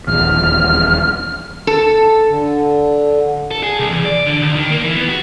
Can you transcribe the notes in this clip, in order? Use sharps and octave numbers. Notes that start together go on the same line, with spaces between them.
D#1 A#1 E2 F6
A4
D3
A4
G#4
C2
E2
D5
D3
D2
D#3
A#3
E3
B3
F#4